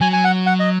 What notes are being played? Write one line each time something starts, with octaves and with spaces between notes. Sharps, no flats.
F#3 G#5
G#5
F#5
F#5
D#5